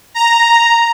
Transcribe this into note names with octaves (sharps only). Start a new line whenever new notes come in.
A#5